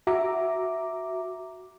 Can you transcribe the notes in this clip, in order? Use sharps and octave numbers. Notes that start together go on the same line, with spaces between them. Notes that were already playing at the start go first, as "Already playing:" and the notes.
F#4 E5 A#5 D6